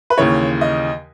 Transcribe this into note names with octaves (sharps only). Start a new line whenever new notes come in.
B4
D#2 C#3 E3 C#5
D#5